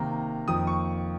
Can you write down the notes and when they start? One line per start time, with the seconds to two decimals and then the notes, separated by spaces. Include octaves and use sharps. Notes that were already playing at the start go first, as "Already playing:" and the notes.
Already playing: C3 D#3 A#3 A#5
0.48 F2 D#3 A#3 D#6
0.67 C#6